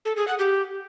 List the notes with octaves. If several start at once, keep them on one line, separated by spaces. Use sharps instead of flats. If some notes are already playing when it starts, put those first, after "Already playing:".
A4
G#4
F#5
G4